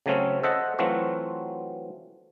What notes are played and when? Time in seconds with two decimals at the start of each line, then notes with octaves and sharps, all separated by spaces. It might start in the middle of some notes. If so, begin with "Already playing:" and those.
0.06 C#3 F#3 A3 C4 C#4
0.43 A4 C5 D#5 E5 F#5
0.79 E3 F#3 A3 C4 F4 F#4